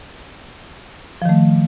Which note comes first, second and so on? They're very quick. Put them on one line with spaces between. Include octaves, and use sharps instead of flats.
F3 D#3 A3